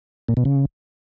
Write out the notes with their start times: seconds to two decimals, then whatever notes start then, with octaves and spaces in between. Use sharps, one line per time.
0.29 A#2
0.37 B2
0.45 C#3